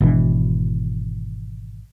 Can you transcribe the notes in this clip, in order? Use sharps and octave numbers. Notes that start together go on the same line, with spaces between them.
G#1 B2 E3 D4